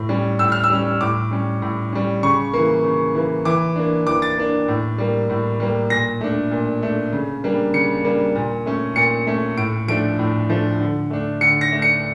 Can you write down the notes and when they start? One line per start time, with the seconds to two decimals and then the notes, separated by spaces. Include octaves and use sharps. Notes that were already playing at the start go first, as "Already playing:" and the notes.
Already playing: A2
0.09 G3 C#4
0.39 A2 E6
0.52 F6
0.64 E6
0.70 G3 C#4
1.01 A2 D6
1.31 G3 C#4
1.62 A2
1.92 G3 C#4
2.23 C#3 C#6
2.53 E3 A#3
2.84 C#3
3.15 E3 A#3
3.45 E3 D6
3.76 A#3 D4
4.07 E3 D6
4.22 A6
4.37 A#3 D4
4.68 A2
4.98 G3 A#3
5.30 A2
5.60 G3 A#3
5.90 A#2 A#6
6.21 A3 D4
6.51 A#2
6.82 A3 D4
7.13 C#3
7.44 G3 A#3 D4
7.74 C#3 C#7
8.05 G3 A#3 D4
8.35 A#2
8.66 A3 C#4
8.96 A#2 C#7
9.27 A3 C#4
9.57 A2 D7
9.88 F3 A3 D4 D7
10.19 A2
10.50 F3 A3 D4
10.80 D3
11.11 A3 D4
11.41 D3 C#7
11.61 A#6
11.72 A3 D4
11.82 C#7